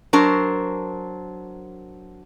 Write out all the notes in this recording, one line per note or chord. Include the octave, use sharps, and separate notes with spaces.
F#3 D4 A#4 C5